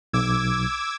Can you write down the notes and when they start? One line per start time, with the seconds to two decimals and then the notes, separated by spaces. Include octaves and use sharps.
0.13 B1 D6 E6 G#6